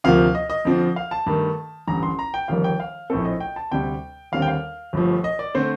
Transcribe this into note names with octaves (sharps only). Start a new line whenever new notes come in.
D2 C3 F3 A#3 F5
D#5
D#5
F2 D3 F3 C4
F5
A5
G2 D#3 A3
A1 G2 D3 A#5
C6
A#5
G5
G1 F2 D#3 G3 F5
G5
F5
A#1 A2 A3 C4 A4
D#5
G5
A5
D2 C3 G3 G5
D#2 D3 G3 C4 F5
G5
F5
G1 G2 F3 A3
D#5
D5
D3 A3 C4 C5